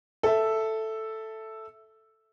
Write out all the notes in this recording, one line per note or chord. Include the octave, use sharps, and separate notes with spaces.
A4 E5